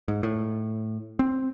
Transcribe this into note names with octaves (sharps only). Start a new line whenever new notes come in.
G#2
A2
C4